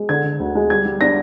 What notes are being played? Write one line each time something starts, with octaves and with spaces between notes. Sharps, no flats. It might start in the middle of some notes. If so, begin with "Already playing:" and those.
Already playing: G#3
D3 G#6
D3
D2
G#3
G3 G#6
G3
D4 A#6